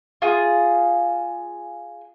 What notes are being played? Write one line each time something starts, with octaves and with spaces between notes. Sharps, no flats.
F4 G#4